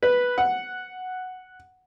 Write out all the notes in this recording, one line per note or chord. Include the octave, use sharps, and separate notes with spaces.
B4
F#5